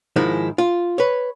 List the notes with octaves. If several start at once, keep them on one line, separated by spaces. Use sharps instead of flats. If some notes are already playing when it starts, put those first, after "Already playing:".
G#2 D#3 F3 G#3 D#4 E4
F4
B4 C#5